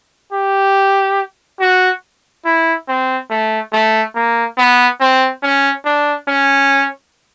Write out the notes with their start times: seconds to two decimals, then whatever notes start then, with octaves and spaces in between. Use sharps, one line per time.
0.33 G4
1.60 F#4
2.45 E4
2.88 C4
3.30 A3
3.73 A3
4.15 A#3
4.58 B3
5.00 C4
5.43 C#4
5.85 D4
6.28 C#4